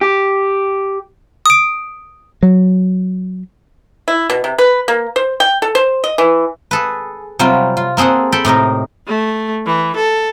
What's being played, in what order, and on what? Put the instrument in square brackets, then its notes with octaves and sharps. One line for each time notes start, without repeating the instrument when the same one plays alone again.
[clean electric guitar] G4
[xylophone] D#6 D7
[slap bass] F#3
[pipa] E4
B2
C3
B4
A#3
C5
G5
A4
C5
D#5
E3
[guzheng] G#4 A4 B4
C3 F#3 G3 F4
F4
A#3 C4 G#4 A4 F#5
A4 G5 B5
A2 C3 D#4 A#4
[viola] A3
E3
A4